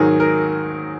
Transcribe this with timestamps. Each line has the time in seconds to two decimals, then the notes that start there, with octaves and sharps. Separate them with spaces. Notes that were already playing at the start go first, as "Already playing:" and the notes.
Already playing: G#2 D#3 F#3 G#4
0.20 A#4